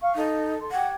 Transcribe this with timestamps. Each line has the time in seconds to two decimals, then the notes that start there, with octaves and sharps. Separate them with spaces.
0.01 F5 C#6
0.16 D#4 A4
0.60 A4 C6
0.71 G4 F#5 G#6